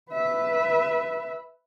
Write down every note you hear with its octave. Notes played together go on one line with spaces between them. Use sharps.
B4 E5